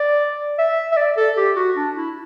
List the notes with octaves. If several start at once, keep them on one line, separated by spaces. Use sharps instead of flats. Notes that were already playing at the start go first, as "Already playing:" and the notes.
Already playing: D5
E5
E5
D5
A4
G4
F#4
D4
E4